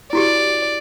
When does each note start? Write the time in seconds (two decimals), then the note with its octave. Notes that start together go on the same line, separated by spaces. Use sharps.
0.13 E4 F#4 G4 D5